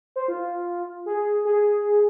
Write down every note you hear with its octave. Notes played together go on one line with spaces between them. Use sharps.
C5
F4
G#4
G#4